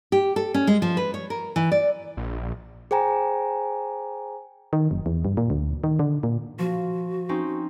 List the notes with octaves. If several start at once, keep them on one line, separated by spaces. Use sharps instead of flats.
G4
A4
C#4
G#3
F3
B4
C#5
A#4
E3
D5
A#1
G#4 C5 G5 G#5 A#5
D#3
F#1
E2
G2
A#2
D2
D#3
D3
A#2
F3 F#4
C4 C#4 D#4